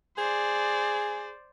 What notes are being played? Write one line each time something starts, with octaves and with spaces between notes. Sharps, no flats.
G#4 C5 D5